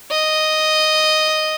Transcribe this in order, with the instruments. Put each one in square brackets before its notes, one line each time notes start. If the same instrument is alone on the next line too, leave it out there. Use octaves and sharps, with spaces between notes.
[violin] D#5